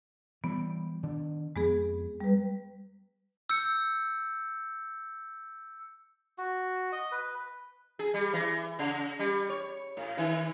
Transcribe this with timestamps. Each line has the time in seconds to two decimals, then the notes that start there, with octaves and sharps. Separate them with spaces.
0.44 E3 G3 B3
1.03 D#3 D4
1.56 F2 G#3 B3 G#4
2.20 G3 B4
3.50 E6 G6 C#7
6.38 F#4
6.92 D#5
7.12 B4
7.99 G#4
8.14 G3
8.33 E3
8.79 C#3
9.19 G3
9.50 C#5
9.97 A2
10.18 D#3